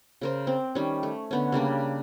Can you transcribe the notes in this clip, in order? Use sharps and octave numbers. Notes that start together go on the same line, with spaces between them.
C#3 A#4 C5
C4
D#3 G3 C#4
A3
D3 B3 C#4
C#3 G3 A#3 D4